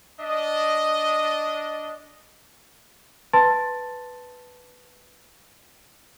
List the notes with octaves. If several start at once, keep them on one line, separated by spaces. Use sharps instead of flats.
D4 D#5
B4 A5 C6 A6